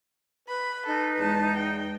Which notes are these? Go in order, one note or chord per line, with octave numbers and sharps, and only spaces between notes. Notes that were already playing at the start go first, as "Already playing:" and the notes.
B4 B5
D#4 A4
E2 G#3 A5
G5